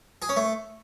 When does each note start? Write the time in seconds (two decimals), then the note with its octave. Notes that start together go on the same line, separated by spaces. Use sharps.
0.22 G#4
0.29 C#4
0.36 A3